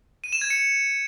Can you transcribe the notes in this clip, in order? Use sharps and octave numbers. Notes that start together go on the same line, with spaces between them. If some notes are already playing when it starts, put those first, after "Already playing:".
D#7
E7
G#6
C#7